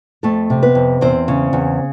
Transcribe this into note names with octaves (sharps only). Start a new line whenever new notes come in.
F2 A3 A4
C3
B3 B4
F2
E2 C4 C5
C#3
E2